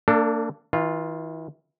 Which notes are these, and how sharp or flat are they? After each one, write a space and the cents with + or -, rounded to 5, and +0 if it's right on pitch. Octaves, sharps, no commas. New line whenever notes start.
A#3 -35 D4 +0 A4 +30
E3 -40 F4 +0